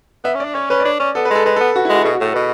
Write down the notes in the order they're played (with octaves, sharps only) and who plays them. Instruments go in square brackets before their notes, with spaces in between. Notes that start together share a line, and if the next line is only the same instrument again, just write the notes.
[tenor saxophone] B3 [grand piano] E5
[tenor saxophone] C#4
[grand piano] D5
[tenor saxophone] D4
[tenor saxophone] C#4 [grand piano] C#5
[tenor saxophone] C#4 [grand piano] B4
[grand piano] D5
[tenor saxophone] D4 [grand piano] C#5
[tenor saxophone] C#4 [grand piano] D5
[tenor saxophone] B3 [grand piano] A4
[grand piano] B4
[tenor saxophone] G#3 [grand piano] A4
[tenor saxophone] G#3 [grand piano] B4
[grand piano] A4
[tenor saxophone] B3
[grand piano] F#4
E4
[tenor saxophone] G#3
[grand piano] F#4
A4
[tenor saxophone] B2 [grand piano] G#4
[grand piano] F#4
[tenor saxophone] A2 [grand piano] A4
[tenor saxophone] B2 [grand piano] B4